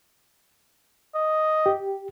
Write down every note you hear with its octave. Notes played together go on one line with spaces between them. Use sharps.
D#5
G4